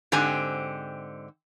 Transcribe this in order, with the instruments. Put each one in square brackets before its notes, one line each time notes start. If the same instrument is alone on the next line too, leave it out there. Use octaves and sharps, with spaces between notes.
[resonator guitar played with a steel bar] G#2 D3 C4 G4 G#5